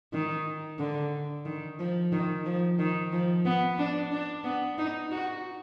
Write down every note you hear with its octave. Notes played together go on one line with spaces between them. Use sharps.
D#3
D3
D#3
F3
D#3
F3
D#3
F3
B3
D4
D4
B3
D#4
F#4